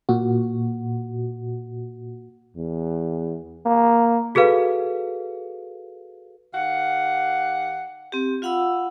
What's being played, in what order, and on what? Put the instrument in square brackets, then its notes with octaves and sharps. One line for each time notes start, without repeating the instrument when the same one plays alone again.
[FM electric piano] A#2 F#4
[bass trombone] E2
A#3
[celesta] F#4 G#4 A4 B4 F5
[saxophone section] D#3 G4 F5 F#5
[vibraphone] C4 G4
F4 F5 F#5 B5 E6